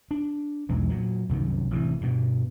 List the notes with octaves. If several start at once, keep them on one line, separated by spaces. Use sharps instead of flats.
D4
B1 E2 E3 G#3
A#2 F#3
C2 F#2 D#3 F#3
A1 G2 C3 E3
G2 B2